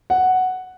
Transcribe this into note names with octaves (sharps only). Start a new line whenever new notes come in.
F#5